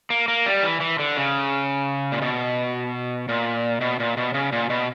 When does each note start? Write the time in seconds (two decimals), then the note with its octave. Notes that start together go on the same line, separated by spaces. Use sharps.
0.10 A#3
0.28 A#3
0.46 G3
0.63 E3
0.81 E3
0.99 D3
1.17 C#3
2.12 A#2
2.22 B2
3.29 A#2
3.81 B2
4.00 A#2
4.17 B2
4.34 C#3
4.52 A#2
4.70 B2